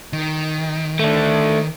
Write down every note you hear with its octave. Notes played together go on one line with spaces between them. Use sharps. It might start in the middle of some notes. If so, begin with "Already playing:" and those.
D#3
A3 D4